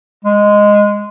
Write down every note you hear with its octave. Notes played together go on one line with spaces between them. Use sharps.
G#3